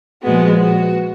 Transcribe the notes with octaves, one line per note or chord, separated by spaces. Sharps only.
A#2 F3 G#3 B3 F#4
F#4